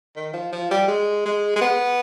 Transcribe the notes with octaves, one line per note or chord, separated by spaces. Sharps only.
D#3
F3
F3
G3
G#3
G#3
G#3
B3